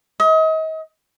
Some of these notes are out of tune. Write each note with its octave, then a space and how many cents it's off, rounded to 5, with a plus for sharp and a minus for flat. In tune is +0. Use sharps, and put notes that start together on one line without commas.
D#5 +35